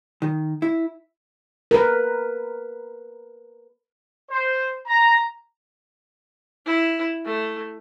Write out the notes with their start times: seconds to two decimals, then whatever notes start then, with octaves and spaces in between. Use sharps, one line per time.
0.22 D#3
0.62 E4
1.71 A#4 B4
4.31 C5
4.87 A#5
6.65 E4
7.25 A3